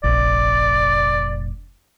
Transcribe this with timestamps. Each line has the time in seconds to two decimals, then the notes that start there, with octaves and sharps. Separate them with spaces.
0.04 F1 A#1 D5